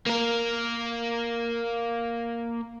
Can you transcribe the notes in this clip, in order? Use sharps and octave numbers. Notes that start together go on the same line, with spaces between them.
A#3 A#4